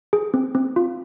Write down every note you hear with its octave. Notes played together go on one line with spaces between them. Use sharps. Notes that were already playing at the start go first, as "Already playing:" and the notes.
G#4
C4
C4
F4